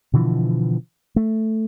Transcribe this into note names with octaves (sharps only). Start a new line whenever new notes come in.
B2 D3 E3 F3
A3